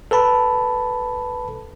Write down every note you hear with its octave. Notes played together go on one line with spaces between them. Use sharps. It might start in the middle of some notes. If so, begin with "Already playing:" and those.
A4 B4 A5 B5